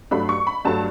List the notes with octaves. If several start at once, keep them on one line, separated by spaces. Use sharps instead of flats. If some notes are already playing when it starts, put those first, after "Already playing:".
G2 F#3 A3 D4 B5
C#6
B5
G2 F#3 A3 D4 A5